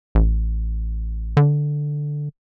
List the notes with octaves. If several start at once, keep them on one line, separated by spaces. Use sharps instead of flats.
A1
D3